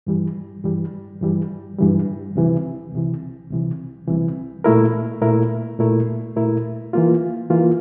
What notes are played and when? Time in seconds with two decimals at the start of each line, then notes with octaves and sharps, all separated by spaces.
0.07 G2 E3 G3
0.64 G2 E3 G3
1.21 G2 E3 G3
1.78 G2 E3 G3
2.35 C2 C3 E3
2.93 C2 C3 E3
3.50 C2 C3 E3
4.07 C2 C3 E3
4.64 A#2 A3 E4 A#4
5.22 A#2 A3 E4 A#4
5.79 A#2 A3 E4 A#4
6.36 A#2 A3 E4 A#4
6.93 E3 A#3 F4
7.50 E3 A#3 F4